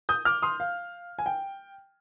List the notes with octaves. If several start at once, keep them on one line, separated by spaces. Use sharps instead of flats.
D#6 G6
D6 F6
C6 D#6
F5
G#5
G5